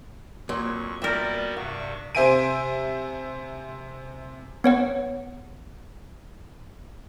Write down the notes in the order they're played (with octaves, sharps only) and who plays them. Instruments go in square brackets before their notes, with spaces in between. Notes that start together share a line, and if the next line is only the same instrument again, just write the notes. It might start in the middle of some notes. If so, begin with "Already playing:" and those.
[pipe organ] F2 C#6 [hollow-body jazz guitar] A#2 F#3
[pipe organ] G3 B3 F#4 [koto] A#4 E5 [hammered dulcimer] D5 G5
[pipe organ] G2 C3 C#6 [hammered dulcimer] F#5
[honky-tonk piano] C3 C5 E5 G#5 D7 D#7
[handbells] B3 C#5 F#5